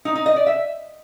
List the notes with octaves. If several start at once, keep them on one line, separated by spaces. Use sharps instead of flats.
D#4
D#4
D#5
D5
E5